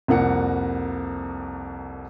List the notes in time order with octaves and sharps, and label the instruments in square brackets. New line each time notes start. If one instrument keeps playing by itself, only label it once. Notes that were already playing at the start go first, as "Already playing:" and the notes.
[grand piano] C2 F2 A#3 F#5 C#7